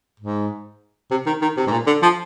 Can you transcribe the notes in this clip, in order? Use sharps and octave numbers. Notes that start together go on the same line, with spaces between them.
G#2
C3
D#3
D#3
C3
G#2
A#2
D3
F3